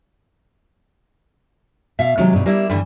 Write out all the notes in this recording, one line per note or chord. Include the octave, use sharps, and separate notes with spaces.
B2 E5 F5
C3 D#3 F#3 G#3
G2 B2
G3 A#3 D4 E4
G2 D3 E3 G3